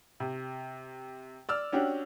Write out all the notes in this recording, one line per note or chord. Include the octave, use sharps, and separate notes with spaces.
C3
D5 E6 F6
C#4 D4 F#4 G4